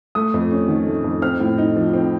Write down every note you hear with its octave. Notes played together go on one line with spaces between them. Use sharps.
A3 D#6
F2
C#4
D#3
A3
F2
C4 F6
A2
D#4
F3
C4